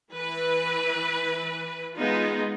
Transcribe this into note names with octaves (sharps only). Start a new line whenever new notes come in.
E3 B4
G#3 B3 D#4 F4